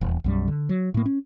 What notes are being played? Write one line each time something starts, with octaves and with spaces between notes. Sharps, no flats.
D#1 E2
B1 F#2 G3
D3
F#3
A2 A#3
C#4